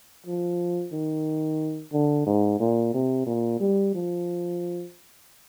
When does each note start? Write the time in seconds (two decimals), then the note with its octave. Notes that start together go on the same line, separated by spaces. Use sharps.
0.26 F3
0.92 D#3
1.92 D3
2.26 G#2
2.60 A#2
2.94 C3
3.26 A#2
3.60 G3
3.95 F3